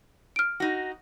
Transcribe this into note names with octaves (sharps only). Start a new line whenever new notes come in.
F6 D7
D#4 F#4